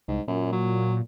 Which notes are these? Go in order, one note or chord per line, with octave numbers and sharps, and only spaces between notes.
C2 G#2
F#2 A#2
F#3